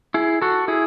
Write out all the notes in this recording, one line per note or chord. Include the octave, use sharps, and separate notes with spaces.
E4 G#4
F#4 A4
E4 G#4